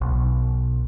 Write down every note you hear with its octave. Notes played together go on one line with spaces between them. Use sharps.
B1